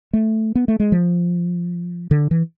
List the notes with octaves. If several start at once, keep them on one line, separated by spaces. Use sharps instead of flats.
A3
B3
A3
G#3
F3
D3
E3